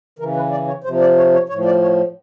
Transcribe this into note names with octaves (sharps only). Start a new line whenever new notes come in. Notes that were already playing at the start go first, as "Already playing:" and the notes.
C#3 E3 A#4
B4
D5
C#5
C3 F3 C5
D5
C#5
C#5
A2 F3 C#5
D5
C#5